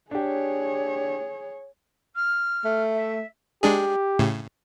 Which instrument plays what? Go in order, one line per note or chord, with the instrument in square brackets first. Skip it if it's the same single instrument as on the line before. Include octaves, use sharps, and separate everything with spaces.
[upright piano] D4 G4 [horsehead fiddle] G#4 C#5
[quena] F6
[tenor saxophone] A3
[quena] E5
[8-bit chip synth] G#3 D4 G#4 [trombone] G4
[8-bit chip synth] A2 C#3